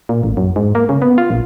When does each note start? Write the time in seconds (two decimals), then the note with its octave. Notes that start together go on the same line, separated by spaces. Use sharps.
0.09 A#2
0.23 A1
0.37 F#2
0.56 G#2
0.75 A#3
0.89 C#3
1.02 B3
1.18 F4
1.30 A#1